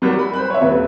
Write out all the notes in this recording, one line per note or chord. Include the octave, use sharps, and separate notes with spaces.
F#3 G3 A#4
B5
C5 B5 F#6
C#5 E5
D#1 B4